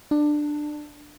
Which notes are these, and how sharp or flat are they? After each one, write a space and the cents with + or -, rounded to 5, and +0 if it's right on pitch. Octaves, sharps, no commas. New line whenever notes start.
D4 +15